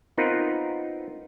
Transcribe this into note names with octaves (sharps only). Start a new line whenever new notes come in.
B3 C4 D#4 F4 A#4 B4